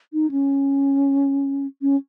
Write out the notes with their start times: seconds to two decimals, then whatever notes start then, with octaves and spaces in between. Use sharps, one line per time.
0.13 D#4
0.31 C#4
1.82 C#4